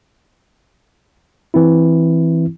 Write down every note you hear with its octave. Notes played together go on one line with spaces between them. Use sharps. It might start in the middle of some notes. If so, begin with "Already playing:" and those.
E3 C4 E4